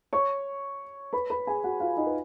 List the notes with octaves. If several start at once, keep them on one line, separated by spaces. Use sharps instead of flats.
C#5 C#6
B4 B5
B4 B5
G#4 G#5
F#4 F#5
F4 F5
D#4 D#5
B4